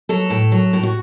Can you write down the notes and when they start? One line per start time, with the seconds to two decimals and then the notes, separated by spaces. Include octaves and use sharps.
0.09 F#3 A4
0.30 A2
0.52 F#3
0.73 A2
0.83 F#4